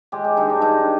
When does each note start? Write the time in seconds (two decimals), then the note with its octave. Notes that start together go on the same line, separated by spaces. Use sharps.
0.12 G#3 G4
0.24 G4
0.37 G2 D#4
0.50 D4
0.62 G2 D#4